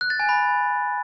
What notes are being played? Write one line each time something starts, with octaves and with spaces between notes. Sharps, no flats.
F#6
A6
G#5
B5